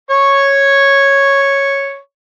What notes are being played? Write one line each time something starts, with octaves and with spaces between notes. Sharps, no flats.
C#5 C#6